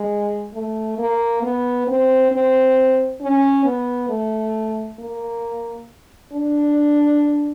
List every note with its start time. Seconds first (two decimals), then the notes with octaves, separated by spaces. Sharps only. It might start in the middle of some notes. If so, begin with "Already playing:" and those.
Already playing: G#3
0.54 A3
0.98 A#3
1.43 B3
1.87 C4
2.31 C4
3.21 C#4
3.65 B3
4.09 A3
4.99 A#3
6.33 D4